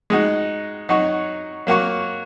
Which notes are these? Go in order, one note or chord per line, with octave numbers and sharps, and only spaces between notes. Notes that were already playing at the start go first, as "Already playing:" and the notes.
G#3 D#4 F#4
F#3 D#4 F#4 C#5
F#3 A#3 F#4 C#5